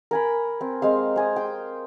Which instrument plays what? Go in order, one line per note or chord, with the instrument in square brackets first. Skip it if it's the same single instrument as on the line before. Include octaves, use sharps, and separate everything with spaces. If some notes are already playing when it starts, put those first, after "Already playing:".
[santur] A#4 G#5 B5
C4
G#3 C4 F5
C4 G#5 D#6
G5 C6